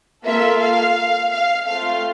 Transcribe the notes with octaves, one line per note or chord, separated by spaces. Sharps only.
A#3 F4 A4 E5
F5
F5
A3 C4 F4 F5